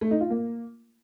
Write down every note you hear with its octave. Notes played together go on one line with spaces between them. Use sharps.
A3
D#4
F4
A#3